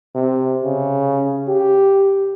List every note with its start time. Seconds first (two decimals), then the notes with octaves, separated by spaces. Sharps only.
0.15 C3
0.65 C#3
1.48 G4